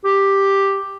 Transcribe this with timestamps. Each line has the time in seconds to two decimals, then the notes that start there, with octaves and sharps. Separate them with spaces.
0.05 G4